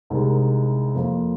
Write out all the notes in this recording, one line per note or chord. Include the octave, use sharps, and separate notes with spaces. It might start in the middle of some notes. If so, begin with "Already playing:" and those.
C2 C3 G#3 D#4 A#4
F2 F3 A#3